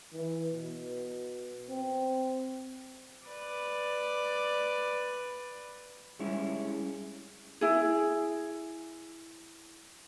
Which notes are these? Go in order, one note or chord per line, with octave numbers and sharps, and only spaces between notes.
E3
B2
C4
B4 D5
G3 G#3 C#4 E4 G#4
E4 G#4